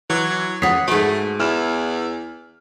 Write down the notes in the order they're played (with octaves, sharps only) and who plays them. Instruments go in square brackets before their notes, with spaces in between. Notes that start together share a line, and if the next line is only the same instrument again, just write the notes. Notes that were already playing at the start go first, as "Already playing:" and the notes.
[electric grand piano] E3 [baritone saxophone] F#3
[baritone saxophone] C#2 [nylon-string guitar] C#5 F#5 [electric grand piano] D#6 B6 C7
[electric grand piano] G#2 F#4 [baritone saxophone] A3 [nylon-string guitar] G#4 B4
[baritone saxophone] E2 [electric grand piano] E4 F6 E7